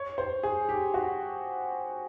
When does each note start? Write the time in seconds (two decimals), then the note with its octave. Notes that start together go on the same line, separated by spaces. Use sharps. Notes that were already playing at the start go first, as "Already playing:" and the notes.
Already playing: C#5
0.18 C5
0.43 G#4
0.69 G4
0.94 F#4